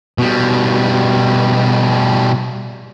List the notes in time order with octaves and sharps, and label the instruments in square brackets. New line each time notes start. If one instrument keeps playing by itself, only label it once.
[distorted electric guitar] B2 G3